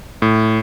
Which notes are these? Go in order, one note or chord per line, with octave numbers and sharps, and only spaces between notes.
A2